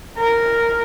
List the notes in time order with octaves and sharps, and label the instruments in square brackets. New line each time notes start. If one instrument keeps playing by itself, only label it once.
[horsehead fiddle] A#4